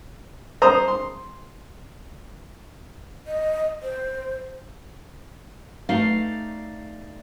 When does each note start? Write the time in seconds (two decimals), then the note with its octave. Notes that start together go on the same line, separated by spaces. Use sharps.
0.62 C5 A#5 D#6
0.88 C6
3.27 D#5
3.82 C5
5.89 A3 D#4 D5 F5